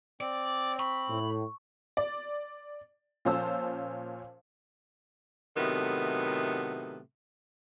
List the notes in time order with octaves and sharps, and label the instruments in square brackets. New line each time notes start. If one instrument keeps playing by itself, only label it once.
[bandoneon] C4 [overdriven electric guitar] D5
[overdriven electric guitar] B5 [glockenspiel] C#6
[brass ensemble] A2
[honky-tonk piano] D5
A#2 F3 C#4 C5 A5 E6
[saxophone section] A2 C3 D#3 F#3 A3 B3